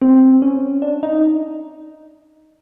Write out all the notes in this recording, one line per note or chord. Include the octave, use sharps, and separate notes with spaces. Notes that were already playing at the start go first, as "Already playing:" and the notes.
C4
C#4
D4
D#4